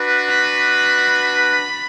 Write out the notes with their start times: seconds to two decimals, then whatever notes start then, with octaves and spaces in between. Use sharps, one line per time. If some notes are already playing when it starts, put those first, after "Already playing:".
Already playing: D4 F#4 B4
0.30 B5